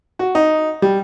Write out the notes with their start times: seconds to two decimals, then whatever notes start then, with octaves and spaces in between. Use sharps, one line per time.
0.19 F#4
0.35 D#4
0.82 G3